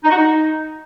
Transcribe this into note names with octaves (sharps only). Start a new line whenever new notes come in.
D#4
F#4
D#4